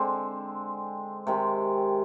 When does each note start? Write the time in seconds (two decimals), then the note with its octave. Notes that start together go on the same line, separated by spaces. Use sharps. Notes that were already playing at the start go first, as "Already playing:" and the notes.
Already playing: D3 G#3 C4
1.27 C3 D#3 G#3 C4